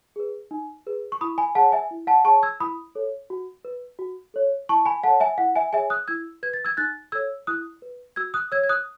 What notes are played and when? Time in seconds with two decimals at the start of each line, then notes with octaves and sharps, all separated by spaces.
0.16 G#4 B4
0.51 D#4
0.86 G#4 B4
1.12 C#6
1.21 E4 B5 D#6
1.38 G#5 B5
1.55 G#4 C#5 F#5 A5
1.72 E5 G#5
1.91 E4
2.07 F#5 A5
2.24 G#4 C#5 A5 C#6
2.43 E6 G#6
2.60 E4 B5 D#6
2.95 A4 C#5
3.30 F#4
3.65 B4
3.99 F#4
4.34 A4 C#5
4.69 E4 A5 C#6
4.86 G#5 B5
5.04 A4 F#5 A5
5.08 C#5
5.20 E5 G#5
5.38 E4 F#5
5.56 E5 G#5
5.73 G#4 C#5 E5 G#5
5.90 D#6 F#6
6.08 E4 E6 G#6
6.43 B4 G#6
6.54 A6
6.65 E6 G#6
6.77 D#4 F#6 A6
7.12 A4 C#5 E6 G#6
7.47 E4 D#6 F#6
7.82 B4
8.16 F#4 E6 G#6
8.34 D#6 F#6
8.52 C#5 E6 G#6
8.63 G#6
8.69 D#6 F#6